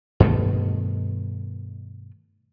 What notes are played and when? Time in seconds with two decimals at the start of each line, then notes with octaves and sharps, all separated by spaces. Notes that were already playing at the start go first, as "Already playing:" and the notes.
0.20 G2 B2 D#3 A3